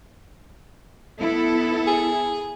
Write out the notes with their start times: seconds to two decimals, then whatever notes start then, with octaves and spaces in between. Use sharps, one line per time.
1.21 B3 E4 A4
1.87 G#4